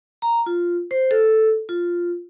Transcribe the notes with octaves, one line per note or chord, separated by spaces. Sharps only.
A#5
F4
C5
A4
F4